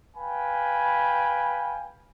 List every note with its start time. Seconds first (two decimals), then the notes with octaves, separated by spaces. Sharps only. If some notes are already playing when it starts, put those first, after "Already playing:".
0.17 B4 F5 G5 G#5 B5